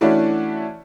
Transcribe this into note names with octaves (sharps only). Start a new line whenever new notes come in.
E3 A3 C#4 D4 E4 F#4